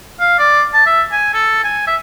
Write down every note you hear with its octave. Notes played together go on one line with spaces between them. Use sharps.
F5
D5
A5
E5
G#5
A4
G#5
E5